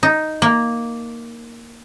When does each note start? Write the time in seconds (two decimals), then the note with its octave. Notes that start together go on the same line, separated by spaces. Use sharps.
0.03 D#4
0.42 A#3